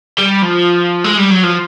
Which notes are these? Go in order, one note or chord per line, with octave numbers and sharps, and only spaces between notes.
G3
F3
G#3
G3
F#3
F3